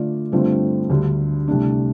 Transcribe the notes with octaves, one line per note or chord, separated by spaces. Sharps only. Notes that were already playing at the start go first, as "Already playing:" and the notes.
Already playing: D3 A3 F4 D5
G2 D3 A3 C4 F4
D2 D3 G3
C2 C3 A3 D4